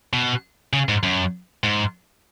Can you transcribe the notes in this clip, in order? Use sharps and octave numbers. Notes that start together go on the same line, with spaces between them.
B2
C#3
G#2
F#2
G#2